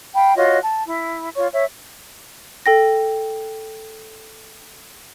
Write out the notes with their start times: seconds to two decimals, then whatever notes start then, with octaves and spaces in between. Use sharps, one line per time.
0.14 F5 G5 B5
0.36 F4 F#4 C#5 D#5
0.61 A5
0.86 E4
1.35 F4 C#5 C#6
1.52 C#5 E5
2.66 A4 G5 A#6